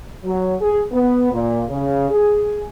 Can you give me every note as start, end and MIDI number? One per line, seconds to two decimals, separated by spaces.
0.24 0.54 54
0.61 0.80 68
0.92 1.31 59
1.32 1.62 46
1.70 2.10 49
2.10 2.66 68